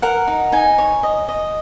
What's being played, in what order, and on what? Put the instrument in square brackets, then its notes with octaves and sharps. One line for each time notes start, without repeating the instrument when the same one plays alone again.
[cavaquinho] A#4 F#5
D#4
D#4 G#5
C#5
D#5
D#5